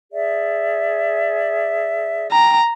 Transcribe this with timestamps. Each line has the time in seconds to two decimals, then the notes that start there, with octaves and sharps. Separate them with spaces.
0.12 G#4 D5 E5
2.32 G5 A#5